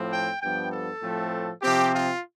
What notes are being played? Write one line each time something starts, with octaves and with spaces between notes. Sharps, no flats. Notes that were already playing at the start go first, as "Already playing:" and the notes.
Already playing: A2 F3 C4
G5
G2 F3 B3 G5
A4
A2 F3 A3 C4
C3 F3 C4 G4
F4